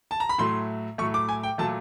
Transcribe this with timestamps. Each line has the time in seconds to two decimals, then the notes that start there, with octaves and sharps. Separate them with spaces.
0.11 A5
0.20 A#5
0.29 B5
0.38 A2 F#3 A3 C6
0.98 A2 F#3 A3 C#6
1.14 D6
1.29 G#5
1.43 G5
1.58 A#2 F#3 A3 A5